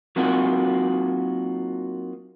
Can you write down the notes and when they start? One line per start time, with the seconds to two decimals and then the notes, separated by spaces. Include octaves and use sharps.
0.16 F#3 A#3 C4 D#4 F4 F#4